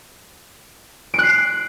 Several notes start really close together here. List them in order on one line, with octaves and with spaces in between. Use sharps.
D7 F#6 C7